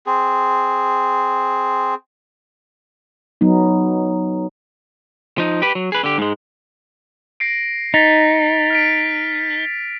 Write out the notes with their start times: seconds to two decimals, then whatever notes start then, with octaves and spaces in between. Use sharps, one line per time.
0.07 C4 G#4
3.41 F#3 B3 D#4
5.38 F3 D#4
5.62 G4 B4
5.75 F#3
5.92 G#4 B4
6.04 D3 G4
6.18 G#2 G#3
7.40 A#6 C7 D7
7.94 D#4 A6 B6 F7
8.70 F6 B6 D7